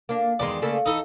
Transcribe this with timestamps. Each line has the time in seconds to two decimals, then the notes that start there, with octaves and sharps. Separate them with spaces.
0.09 A#3 D4
0.39 E2 D#3 G#3 D5 C6
0.62 C#3 A3 A#3
0.86 E3 D#4 A4